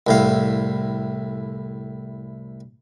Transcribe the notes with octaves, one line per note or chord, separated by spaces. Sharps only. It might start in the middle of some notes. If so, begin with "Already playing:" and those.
C2 A2 F5